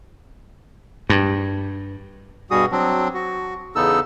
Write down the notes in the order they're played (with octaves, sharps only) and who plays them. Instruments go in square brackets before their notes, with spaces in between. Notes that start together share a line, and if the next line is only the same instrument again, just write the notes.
[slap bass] G2
[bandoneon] G2 B2 G3 F#4 G#4 D#6
F#3 C4 D4
F#4
E2 C#3 B3 D#4 A4 E6